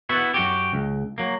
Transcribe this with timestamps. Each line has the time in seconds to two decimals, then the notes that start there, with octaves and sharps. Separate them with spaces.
0.09 B3 E4 F#4
0.34 F#2 F#4 G4
0.73 C#2
1.18 F#3 A#3